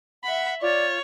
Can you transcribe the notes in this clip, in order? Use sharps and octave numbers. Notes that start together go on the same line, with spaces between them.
E5 F#5 B5
F4 C#5 D5